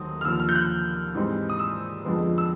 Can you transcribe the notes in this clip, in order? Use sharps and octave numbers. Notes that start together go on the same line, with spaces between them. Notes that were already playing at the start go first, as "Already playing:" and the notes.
Already playing: D#2 D#3 F#3 A3 C4 D#6
F6
D#2 D3 F3 E6
F6
G6
F#6
G#2 E3 G3 C4 D#4
D#6
E6
F2 D3 F3 G#3 B3
E6